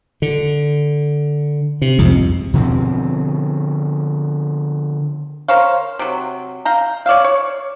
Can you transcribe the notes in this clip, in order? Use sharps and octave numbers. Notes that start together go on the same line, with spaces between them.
D3
C3
C2 F2 G#2
B2 D3 F3 C4
A#4 C5 C#5 F5
C3 F#3
F5 G5 A#5
C#5 D5 E5 F5
C#5